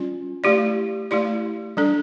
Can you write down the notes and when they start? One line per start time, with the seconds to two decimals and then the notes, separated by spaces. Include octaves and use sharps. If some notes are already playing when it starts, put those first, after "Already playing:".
Already playing: G3 C#4 F4
0.44 A3 E4 G4 D5
1.11 A3 E4 G4 D5
1.77 G3 D4 A4